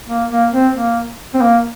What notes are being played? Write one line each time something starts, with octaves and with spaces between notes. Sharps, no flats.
A#3
A#3
C4
A#3
C4
A#3